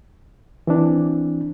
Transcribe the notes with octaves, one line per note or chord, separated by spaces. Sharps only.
E3 C4 D4